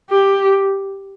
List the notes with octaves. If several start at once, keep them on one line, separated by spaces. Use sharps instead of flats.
G4